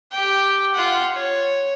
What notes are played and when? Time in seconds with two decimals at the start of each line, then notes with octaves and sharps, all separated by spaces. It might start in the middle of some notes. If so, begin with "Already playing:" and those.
0.12 G4 G5
0.74 F4 F#5
1.14 C#5